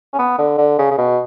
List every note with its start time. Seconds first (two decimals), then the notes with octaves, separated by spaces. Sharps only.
0.14 C#4
0.19 B3
0.39 D3
0.58 D3
0.79 C#3
0.91 C#3
0.98 B2